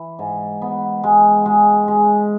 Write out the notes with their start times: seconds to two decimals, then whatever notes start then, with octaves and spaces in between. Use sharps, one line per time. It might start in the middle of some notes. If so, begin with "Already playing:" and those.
Already playing: E3
0.19 G#2
0.62 B3
1.04 G#3
1.46 G#3
1.88 G#3